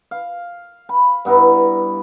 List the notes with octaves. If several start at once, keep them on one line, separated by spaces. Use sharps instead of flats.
F5
B5
G2 B3 E4 A#5